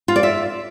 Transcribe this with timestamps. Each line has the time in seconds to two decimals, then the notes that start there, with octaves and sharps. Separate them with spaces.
0.08 F4
0.16 D5
0.23 E5